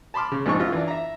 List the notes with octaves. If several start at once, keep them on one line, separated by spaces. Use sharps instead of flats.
A5 B5 C6 D6 F6
C#3
A#1 G#2 F3 D#4 C#6
F#2 F4
E3 D4
E5 A#5